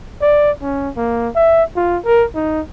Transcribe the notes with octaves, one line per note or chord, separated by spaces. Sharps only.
D5
C#4
A#3
E5
F4
A#4
D#4